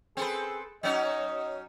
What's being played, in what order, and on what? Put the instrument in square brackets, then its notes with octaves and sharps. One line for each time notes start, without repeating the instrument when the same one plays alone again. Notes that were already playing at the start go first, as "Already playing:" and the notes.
[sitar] C4 A4 B4 [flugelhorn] G#4
[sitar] F#3 C#4 D#4 [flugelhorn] D#5